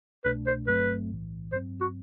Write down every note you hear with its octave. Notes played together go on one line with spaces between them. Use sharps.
C2 B2 A3 D4 B4
C5
G1 G2 F#3 A3 C4 B4
B1 A2 E3
G2 F#3 C4 C5
F#4